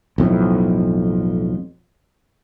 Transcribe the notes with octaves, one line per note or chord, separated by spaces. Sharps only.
B1 F2 A2